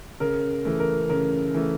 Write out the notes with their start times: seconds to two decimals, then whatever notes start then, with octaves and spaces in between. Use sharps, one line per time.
0.20 C#3 A#4
0.65 E3 A3
0.80 A#4
1.09 C#3 A#4
1.54 E3 A3